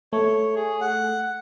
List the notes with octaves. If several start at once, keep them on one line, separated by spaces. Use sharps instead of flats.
A3 C#5
G#4
F#5